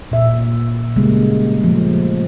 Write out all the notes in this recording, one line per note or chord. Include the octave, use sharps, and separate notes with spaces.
A#2 E5
C#3 G3 G#3 A#3
F3 A3